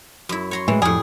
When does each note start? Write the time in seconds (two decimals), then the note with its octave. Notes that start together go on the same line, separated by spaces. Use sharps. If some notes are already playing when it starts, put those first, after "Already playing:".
0.29 F#2 E4
0.51 C#5 A#5 C6
0.68 A2 E3 G#3
0.82 F2 A2 G3 G#4